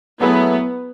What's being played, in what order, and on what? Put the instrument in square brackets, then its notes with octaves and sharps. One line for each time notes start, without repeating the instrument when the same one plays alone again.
[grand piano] F#3 A3 E4 G#4 B4 [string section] B3